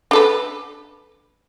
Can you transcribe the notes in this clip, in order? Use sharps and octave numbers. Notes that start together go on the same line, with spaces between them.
D4 A4 B4